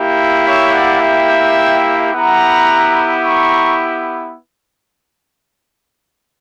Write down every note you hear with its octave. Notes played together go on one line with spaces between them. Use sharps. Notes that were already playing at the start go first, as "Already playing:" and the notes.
Already playing: A#3 E4 G4
C#5 E5
D5 F#5
E5 G5
B3 E4 G4 F#5 A#5
A#5 C#6